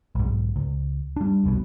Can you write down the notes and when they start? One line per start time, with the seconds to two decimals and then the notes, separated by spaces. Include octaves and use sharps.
0.15 B1 G#2
0.56 C#2
1.17 G3 D4
1.44 F1 C2 B2